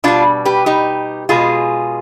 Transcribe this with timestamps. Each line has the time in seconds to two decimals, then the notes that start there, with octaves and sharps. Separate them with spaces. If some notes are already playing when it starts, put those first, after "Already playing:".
0.04 B2 G3 D4 F4
0.45 G4 B4
0.66 D#4 G4
1.29 B2 G#3 F4 G#4